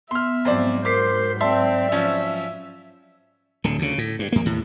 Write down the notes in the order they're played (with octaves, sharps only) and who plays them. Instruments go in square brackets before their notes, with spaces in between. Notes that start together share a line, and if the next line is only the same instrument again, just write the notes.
[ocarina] B3 [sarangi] E5 [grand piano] C6 F6
[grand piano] F2 C5 D5 [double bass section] G#2 F#3
[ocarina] A#4 [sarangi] C5 [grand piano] D6 B6 C7
[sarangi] C4 [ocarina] D5 [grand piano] E5 A5 C6
[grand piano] F3 C#4 [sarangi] E5
[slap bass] D1 D3
D2 C#3
A2
G2
F2 A#3
D#2 A2